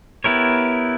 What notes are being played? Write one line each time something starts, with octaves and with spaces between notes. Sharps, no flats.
B3 E4 G4 A#4 C#5